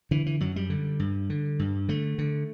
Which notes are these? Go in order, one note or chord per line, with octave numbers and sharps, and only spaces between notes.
D3 E3
E3
F#2 F#3
G3
D3
G2
D3
G2
D3 A3
D3